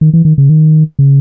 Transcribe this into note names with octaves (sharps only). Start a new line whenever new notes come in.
D#3
E3
D#3
C#3
D#3
C#3